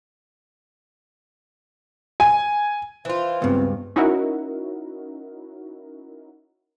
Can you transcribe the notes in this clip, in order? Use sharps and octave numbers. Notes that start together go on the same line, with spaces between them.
G#5
E3 F4 C5
C#2 G2 B3 C4
C#4 D#4 E4 F#4 A#4